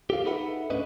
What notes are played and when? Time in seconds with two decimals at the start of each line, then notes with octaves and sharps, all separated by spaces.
0.10 G4 A4 F5
0.25 D#4 G#4 A4 B4 E5 F#5
0.70 A2 C#4 D4 B4 D#5